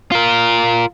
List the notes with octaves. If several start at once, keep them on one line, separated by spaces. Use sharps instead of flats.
F4 A#4